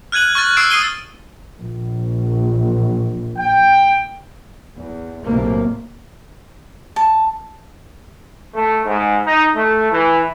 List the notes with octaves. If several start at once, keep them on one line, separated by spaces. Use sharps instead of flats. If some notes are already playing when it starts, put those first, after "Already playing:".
F6 F#6 G#6 D#7 F#7
C#6 F6 A6 F#7
C#6 E6 G#6 C7 D7 E7
D#6 C7 D#7 G7
A#1
G5
E2
B1 A2 C3 A#3
A5
A3
G#2
D#4
A3
E3